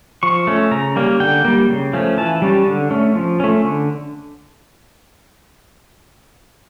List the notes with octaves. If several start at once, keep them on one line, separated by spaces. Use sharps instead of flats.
F3 C#6
A3 C#4
C#3 A#5
G3 A#3 C#4
D3 G5
G3 A#3
C#3
F3 A3 C#4
E3 A5
G3 C#4
D3
A3 C#4
F3
A3 C#4
D3